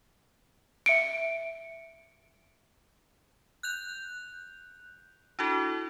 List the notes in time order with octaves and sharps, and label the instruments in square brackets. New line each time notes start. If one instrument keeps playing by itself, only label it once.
[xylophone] E5 C#7 D7
[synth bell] F#6 G6 F7
D4 E4 F#4 A4